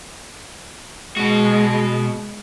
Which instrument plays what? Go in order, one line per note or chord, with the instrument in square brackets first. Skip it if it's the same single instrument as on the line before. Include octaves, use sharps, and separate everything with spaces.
[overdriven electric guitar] B2 F#4 [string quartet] G#3